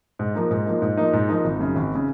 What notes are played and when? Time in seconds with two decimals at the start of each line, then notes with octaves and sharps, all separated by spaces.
0.19 G#2
0.35 F3 A#3 D#4
0.51 G#2
0.66 F3 A#3 D#4
0.82 G#2
0.97 F3 A#3 D#4
1.13 G#2
1.29 F3 A#3 D#4
1.44 G#1
1.60 F#2 C#3
1.76 G#1
1.95 C#3